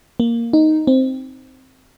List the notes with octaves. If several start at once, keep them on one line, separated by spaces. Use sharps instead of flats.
A#3
D#4
C4